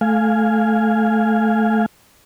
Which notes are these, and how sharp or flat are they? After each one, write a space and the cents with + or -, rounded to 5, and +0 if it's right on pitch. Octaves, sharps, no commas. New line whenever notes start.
A3 -15 F5 +0 G#5 +0